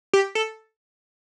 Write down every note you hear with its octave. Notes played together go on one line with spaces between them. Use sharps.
G4
A4